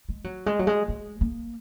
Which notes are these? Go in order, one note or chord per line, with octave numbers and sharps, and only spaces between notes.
G#3
F#3
G#3
F#3
G#3
G#3
A#3